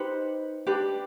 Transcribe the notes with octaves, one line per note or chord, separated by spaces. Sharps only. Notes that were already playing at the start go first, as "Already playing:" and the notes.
Already playing: D#4 G4 B4 C5
D4 G4 B4